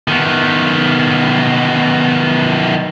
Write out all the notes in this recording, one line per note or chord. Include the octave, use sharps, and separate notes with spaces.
D#3 B3